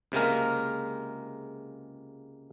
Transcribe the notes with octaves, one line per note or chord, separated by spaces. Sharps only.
C#2 C3 G#3 A#3 A#4